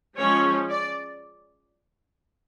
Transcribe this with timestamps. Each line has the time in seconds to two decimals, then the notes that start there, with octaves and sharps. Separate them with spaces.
0.18 F3 G#3 C#4 C#5
0.69 D5